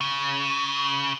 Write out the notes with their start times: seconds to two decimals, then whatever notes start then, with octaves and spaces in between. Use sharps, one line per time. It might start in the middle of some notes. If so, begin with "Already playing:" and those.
0.01 C#3